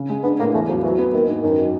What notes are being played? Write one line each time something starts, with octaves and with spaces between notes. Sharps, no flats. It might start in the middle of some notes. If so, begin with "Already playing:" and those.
Already playing: C#3
G#3
B3 D4
A2 A#3
E2 A3
F3 F#3
E3 F#3
B3
D#3 A#3
G#2
F#2 D#3
F#3